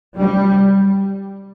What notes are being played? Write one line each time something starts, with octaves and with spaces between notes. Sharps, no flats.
G3